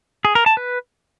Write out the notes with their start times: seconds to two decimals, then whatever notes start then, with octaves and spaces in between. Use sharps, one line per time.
0.25 G#4
0.35 A#4
0.46 A5
0.57 B4